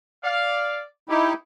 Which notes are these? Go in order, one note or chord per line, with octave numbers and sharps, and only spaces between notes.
D5 F5
D#4 E4 G4